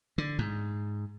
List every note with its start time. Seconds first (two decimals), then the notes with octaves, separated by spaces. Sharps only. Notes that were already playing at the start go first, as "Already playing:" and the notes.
0.18 D3
0.39 G#2